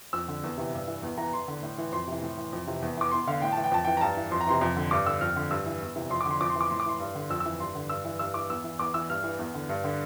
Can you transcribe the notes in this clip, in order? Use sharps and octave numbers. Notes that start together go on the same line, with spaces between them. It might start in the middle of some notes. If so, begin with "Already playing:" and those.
F2 E6
D3
E2
C3 E3
G2
E3
E2
E3 A#5
E2 C6
D3
A2
E3
F2 C6
C3 E3
A2
E3
F2
C3 E3
E2
E3 D6
E2 C6
D3 F5
A2 G5
A5
E3
G5
F2 A5
E3 G5
A#5
G2 A5
E3
F2 C6
A#5
C3 E3 C6
F2
D3
G2 D6
D3 E6
F2 F6
D3
G2 E6
E3
E2
C3 E3
F2 C6
D6
D3 C6
F2 D6
C6
E3
D6
A2 C6
D6
E3 C6
G2
D3
F2 E6
E6
E3
G2 C6
D3
G2 E6
E3
G2 E6
E3 D6
E2 E6
E3
E2 D6
E3 E6
G2 F6
E3
E2
D3
G2
D3